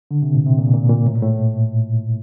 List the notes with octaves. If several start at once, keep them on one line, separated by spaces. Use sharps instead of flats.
D3
C3
A#2
C3
A#2
A#2
A#2
A2
A#2
A2